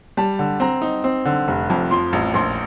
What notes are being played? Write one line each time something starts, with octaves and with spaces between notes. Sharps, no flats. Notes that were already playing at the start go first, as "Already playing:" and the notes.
G3 A5
D3
C4 A#5
D#4
C4
D3
F1
F2
F3 C6
A1
A#1 C6